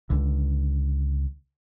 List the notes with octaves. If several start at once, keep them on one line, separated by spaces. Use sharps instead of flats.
C#2 D3